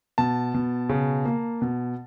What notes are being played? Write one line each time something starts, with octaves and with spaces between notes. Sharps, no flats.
B2 A5
B2
C#3
A#3
B2